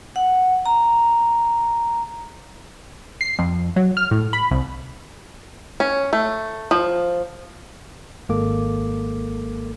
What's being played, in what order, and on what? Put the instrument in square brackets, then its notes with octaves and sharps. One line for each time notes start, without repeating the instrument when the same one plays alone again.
[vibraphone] F#5
A#5
[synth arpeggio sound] C7
F2
F#3
F6
A2
B5
C2
[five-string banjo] C#4
A3
F3
[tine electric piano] G#1 G#3 A#3 A4 D6